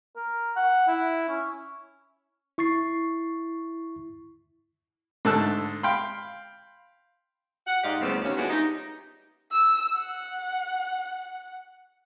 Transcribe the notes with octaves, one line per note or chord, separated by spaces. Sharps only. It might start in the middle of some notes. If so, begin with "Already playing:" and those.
A#4
F#5
E4
C#4
E4 C#6 A6 C7
G#2 D3 A3 A5 E6 F#6
F5 G5 B5 C6
F#5
G#2 D#4 G4 D5 D#5 F5
D2 A2 C#3 G3 B3 C4
D#2 C#4
F3 G#3 B3 D4 E4 F#4
D#4 G4
E6
F#5